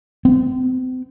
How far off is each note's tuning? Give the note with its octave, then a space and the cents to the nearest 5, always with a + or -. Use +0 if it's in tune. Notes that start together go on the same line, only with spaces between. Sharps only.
C4 -40